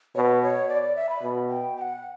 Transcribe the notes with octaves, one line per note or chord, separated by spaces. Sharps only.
B2 B4 C#5
C#5
D5
D5
E5
B5
B2
G5
G5
F#5